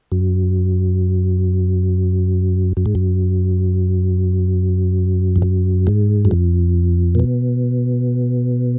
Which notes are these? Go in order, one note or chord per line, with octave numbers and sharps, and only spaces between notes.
F#2
F#2
G#2
F#2
F2
F#2
G#2
F#2
F2
A#2
B2